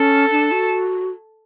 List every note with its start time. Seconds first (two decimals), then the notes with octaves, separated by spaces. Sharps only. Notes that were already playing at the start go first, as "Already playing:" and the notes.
Already playing: C#4 A4
0.31 D4
0.52 F#4